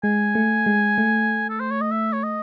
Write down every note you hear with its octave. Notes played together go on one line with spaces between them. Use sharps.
G#3 G#5
A3
G#3
A3
A4
C5
C#5
D#5
E5
C#5
D#5